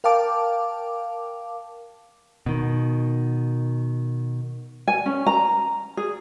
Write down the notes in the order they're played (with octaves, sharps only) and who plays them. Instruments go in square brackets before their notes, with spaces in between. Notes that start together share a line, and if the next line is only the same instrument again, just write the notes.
[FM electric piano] A#4 F5 G5 A5 D6
[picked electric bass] B2 D#3
[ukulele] G#5
C#4
A#5
G#4